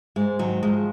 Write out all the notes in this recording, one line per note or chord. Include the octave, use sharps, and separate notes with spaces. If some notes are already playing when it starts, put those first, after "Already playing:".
G#2 G#3
D#3 F#3
F3 G#3